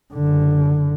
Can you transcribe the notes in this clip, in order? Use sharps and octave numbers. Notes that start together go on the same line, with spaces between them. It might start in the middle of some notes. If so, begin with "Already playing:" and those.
F#1 D3